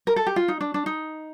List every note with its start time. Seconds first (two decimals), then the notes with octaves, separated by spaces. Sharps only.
0.07 A#4
0.16 A4
0.27 G4
0.36 F4
0.48 D#4
0.61 D4
0.74 D4
0.86 D#4